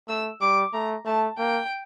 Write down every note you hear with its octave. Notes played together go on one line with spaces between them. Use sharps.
A3 E6
G3 D6
A3 A#5
A3 A5
A#3 G5